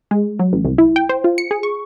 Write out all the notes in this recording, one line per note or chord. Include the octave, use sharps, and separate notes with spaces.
G#3
F#3
A1
C2
E4
G5
C5
F4
C#7
G#4
C#6